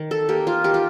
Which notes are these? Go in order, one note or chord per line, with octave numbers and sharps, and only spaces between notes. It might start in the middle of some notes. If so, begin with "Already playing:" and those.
Already playing: D#3
A4
A#3 G4
F4
D#3 G4
F4